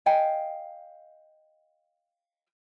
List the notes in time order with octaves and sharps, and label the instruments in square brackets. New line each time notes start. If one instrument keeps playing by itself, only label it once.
[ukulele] D#5 F5 G5 G#5